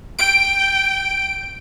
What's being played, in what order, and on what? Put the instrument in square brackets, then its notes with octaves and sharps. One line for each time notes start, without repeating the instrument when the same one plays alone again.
[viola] G5 [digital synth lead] D7